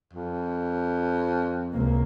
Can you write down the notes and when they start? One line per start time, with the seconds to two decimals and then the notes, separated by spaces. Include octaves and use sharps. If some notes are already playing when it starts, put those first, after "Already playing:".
0.14 F2
1.72 C#2 C3 A#3